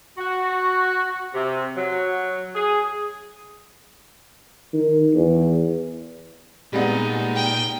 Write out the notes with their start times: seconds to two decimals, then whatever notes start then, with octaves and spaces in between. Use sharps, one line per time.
0.18 F#4
1.34 C3
1.76 F#3
2.55 G#4
4.74 D#3
5.13 E2
6.73 A#2 G3 G#3 B3 D#4
7.36 G5